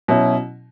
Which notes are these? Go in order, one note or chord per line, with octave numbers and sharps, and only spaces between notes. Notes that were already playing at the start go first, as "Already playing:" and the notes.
B2 F#3 C#4 E4